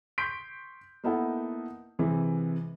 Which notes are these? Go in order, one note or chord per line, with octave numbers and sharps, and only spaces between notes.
C6 C#6 G6 B6 D7
A#3 B3 D#4 E4 A4 F#5
C3 E3 G#3